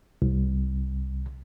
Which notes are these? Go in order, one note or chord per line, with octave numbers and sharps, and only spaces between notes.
C2